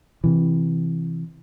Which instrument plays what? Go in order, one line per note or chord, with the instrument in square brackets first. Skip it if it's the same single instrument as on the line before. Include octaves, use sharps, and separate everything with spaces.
[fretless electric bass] C3 E3